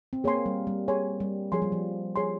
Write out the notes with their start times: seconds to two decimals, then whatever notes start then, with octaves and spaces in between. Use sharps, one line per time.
0.13 C4
0.24 A#3 G#4 C#5 G#5 C6
0.46 G3
0.67 G3
0.88 G#4 C#5 G#5 C6
1.20 G3
1.52 F3 G#4 C#5 G#5 C6
1.62 G3
1.72 F3
2.16 G#4 C#5 G#5 C6